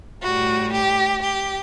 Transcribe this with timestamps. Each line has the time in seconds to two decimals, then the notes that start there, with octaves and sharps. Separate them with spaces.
0.22 A2 G3 F#4
0.72 G4
1.21 G4